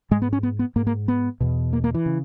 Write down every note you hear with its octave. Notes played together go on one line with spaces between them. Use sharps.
G#2 G#3
B3
C#4
B3
B3
G#2 A#3
A#3
B3
E2 B2
A#3
A#3
E3
C#3